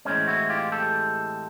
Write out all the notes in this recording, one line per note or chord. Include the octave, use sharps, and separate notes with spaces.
A2 E3 G#3 C4 C#4
E4 F#4
F4 G4
G4 A4